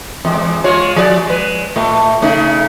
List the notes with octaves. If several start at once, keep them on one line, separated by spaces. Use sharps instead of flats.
E2 G#3
G#3 F4 C#5
F3 G#4 D5
G#3 B4
A2 A3
C#3 A3 D#4